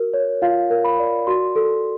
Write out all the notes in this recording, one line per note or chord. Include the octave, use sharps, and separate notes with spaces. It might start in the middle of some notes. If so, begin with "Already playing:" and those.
Already playing: F#4 A#4
C#5
F4 F5
A#4
B5
D5
F#4 C6
A4